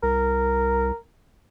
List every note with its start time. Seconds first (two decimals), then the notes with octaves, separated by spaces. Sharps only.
0.03 C2 A#4